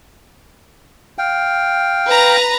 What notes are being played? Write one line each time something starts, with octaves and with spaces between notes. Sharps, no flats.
F5 G5
B4 A#5